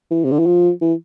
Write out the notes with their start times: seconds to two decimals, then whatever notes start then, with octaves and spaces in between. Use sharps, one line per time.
0.11 E3
0.24 C3
0.31 D3
0.39 E3
0.46 F3
0.81 E3